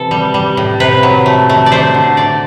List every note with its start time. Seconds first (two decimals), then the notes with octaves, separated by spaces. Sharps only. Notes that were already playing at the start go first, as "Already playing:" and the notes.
Already playing: C3 E3 A4
0.11 G3
0.34 G3
0.57 A2
0.80 C3 B4
1.03 F#3
1.26 A3
1.50 A3
1.66 D5
1.72 A3 C5
1.94 D3
2.17 A3 D5